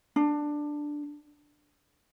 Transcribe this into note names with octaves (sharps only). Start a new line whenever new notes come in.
D4